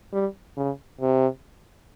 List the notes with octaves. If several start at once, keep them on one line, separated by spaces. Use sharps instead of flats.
G3
C#3
C3